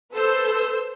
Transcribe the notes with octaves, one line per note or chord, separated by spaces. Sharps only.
A4 B4 C5 E6 G6 C7